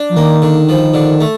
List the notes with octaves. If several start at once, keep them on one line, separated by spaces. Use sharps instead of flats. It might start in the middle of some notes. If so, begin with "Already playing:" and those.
Already playing: D4
F3
D#3 A#3
D3
F3
D3
A3